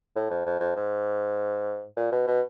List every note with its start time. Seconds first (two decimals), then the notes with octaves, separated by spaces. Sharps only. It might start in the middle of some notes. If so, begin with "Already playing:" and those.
0.16 A2
0.30 F2
0.46 F2
0.60 F2
0.76 G#2
1.96 A#2
2.12 B2
2.27 B2